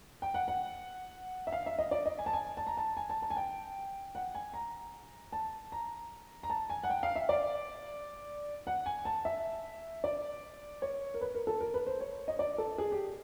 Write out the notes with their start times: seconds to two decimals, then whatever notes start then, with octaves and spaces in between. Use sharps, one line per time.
0.22 G5
0.34 F#5
0.48 F#5
1.47 E5
1.52 F5
1.66 E5
1.78 D#5
1.91 D5
2.06 D#5
2.18 G#5
2.26 A5
2.33 G#5
2.57 A5
2.67 A#5
2.77 A5
2.97 G#5
3.10 A5
3.22 A5
3.30 G#5
3.37 G5
4.15 F#5
4.35 G#5
4.54 A#5
5.32 A5
5.72 A#5
6.43 A#5
6.50 A5
6.70 G#5
6.83 F#5
6.90 G5
7.03 F5
7.16 E5
7.29 D5
8.67 F#5
8.86 G#5
9.05 A5
9.25 E5
10.04 D5
10.82 C#5
11.14 A#4
11.21 B4
11.35 A#4
11.47 A4
11.60 A#4
11.74 B4
11.87 C5
12.00 C#5
12.28 D#5
12.39 D5
12.58 A4
12.78 G#4
12.92 G4